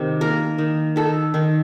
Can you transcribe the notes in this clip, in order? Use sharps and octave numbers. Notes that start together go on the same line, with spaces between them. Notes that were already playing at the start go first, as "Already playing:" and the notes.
Already playing: C3 D#3
A#3 A#4
D#3
D#3 A4
D#3